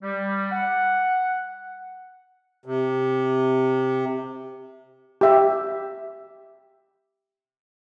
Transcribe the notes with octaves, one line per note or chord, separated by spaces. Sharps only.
G3
F#5
C3
G4 E5